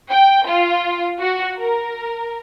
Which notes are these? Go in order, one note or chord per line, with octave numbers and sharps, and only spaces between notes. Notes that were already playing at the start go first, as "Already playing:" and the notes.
G5
F4
F#4
A#4